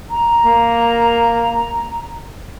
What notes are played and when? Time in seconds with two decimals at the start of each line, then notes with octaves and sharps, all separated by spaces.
0.11 A#5
0.45 A#3